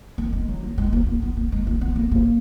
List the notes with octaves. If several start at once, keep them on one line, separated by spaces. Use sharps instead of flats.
A#3
G#3
F#3
A#3
G#3
A#3
B3
B3
A#3
G#3
A#3
B3
A#3
A#3